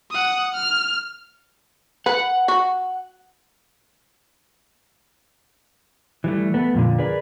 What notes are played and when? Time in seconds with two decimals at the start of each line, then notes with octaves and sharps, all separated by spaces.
0.10 F#5 D#6
0.54 F6
2.06 B4 F#5
2.48 F#4
6.24 E3 G3 A3
6.54 A3 B3
6.74 F2 A#2 D3
6.98 G#4 A#4 B4 D5